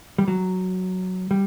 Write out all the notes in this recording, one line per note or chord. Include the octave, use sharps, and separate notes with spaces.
G3
F#3
G3